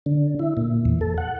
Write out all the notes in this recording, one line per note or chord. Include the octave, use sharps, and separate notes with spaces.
D3
E4
A#2
E2
A4
F#5